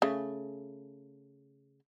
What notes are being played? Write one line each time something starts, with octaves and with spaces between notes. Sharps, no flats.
C#3 A3